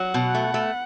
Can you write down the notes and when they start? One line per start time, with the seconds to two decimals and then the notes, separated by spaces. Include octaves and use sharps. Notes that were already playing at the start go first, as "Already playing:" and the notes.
Already playing: F#3 F#5
0.14 B2
0.35 A3
0.54 A3